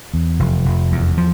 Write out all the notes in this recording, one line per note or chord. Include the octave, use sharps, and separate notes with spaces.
E2
F1
F1
E2
F3